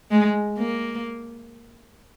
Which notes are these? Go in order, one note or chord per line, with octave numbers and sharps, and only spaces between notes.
G#3
A#3